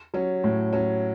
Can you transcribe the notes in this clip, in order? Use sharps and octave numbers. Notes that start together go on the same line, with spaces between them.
F#3 C#4
A2
F#3 C#4